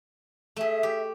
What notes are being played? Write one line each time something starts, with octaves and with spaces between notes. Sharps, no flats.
A3 G#4 E5
G4